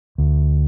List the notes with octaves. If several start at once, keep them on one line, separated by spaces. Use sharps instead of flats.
D2